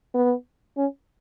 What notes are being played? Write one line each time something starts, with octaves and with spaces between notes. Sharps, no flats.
B3
C#4